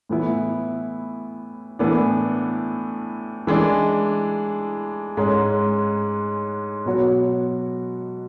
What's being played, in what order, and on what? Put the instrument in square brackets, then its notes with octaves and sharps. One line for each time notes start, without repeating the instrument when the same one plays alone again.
[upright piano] A2 E3 B3 E4
A2 E3 B3 D4
E3 G#3 D4
G#2 G#3 C#4
B2 F#3 B3 F#4 C#5